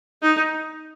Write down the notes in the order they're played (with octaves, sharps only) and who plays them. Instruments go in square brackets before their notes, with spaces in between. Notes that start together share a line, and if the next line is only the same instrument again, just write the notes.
[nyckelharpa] D#4